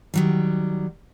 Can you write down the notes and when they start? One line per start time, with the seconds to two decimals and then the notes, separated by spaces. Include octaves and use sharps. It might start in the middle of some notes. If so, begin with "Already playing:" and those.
0.14 D#3 F#3 G3